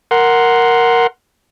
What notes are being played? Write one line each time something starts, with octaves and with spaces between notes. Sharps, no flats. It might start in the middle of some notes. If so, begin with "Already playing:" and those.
A#4 F#5 C6